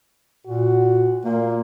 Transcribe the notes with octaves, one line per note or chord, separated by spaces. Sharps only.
A#2 F#4
A#2 A#3